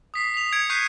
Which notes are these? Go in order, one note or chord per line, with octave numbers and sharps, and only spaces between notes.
D#6 B6 C7
B6 F7
G#6 C#7 D7
C#6 F#6 G6 B6 C7 D#7